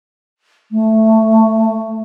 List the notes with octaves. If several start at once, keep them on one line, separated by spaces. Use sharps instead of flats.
A3